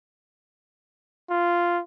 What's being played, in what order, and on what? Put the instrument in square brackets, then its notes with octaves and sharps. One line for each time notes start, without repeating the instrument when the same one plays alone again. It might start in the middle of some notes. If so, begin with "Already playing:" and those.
[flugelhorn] F4